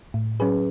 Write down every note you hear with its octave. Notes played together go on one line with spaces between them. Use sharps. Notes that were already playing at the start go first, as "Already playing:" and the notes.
A2
F#3 C#4 G#4 B4